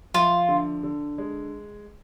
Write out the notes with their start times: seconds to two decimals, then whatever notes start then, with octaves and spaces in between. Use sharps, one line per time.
0.14 F3 F4
0.49 D3
0.83 D3
1.18 G#3